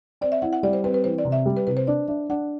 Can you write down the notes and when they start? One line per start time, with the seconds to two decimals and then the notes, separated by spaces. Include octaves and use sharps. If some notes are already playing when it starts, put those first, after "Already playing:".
0.21 C4 D5
0.32 E5
0.42 E4 F#5
0.53 F#5
0.63 G3 D5
0.73 C5
0.84 C4 B4
0.94 B4
1.04 E3 C5
1.18 D5
1.25 C3
1.32 E5
1.46 G3
1.57 B4
1.67 C3 B4
1.77 C5
1.87 D4 D5
2.08 D4 E5
2.30 D4 F#5